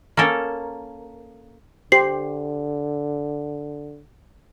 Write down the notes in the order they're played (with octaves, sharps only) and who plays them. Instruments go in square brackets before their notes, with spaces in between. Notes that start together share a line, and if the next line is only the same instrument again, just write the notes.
[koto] A#3 C#4 A4 A#4
[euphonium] D3 [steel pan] G4 C5 [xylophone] C7